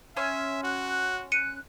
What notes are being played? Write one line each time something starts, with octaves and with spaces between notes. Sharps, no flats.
C#4 E5 C6 E6
F#4 F#6
F#6 C#7 D#7